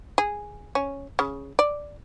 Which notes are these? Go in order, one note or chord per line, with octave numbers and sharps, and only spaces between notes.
G#4
C#4
C#3
D5